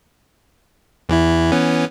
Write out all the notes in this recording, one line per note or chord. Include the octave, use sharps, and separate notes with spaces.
E2 E3 E4
E3 B3 C#4